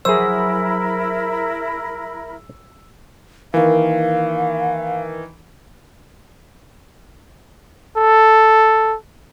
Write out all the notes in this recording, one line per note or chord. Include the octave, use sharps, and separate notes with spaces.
F#3 E4 G#4 A#4 C5 B5 E6
D#3 E3 A#3 D5 F5 G#5
A4